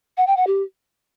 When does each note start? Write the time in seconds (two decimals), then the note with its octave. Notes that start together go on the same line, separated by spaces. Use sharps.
0.17 F#5
0.27 G5
0.37 F#5
0.47 G4